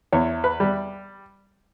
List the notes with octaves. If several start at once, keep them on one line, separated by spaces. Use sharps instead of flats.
E2 C#5
B4
G3